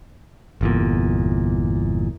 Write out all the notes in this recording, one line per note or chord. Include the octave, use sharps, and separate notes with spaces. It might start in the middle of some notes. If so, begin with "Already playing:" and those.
G1 E2 A#2